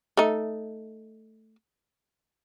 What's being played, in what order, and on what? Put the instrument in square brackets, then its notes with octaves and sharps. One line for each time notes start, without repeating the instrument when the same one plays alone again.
[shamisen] A3 D#4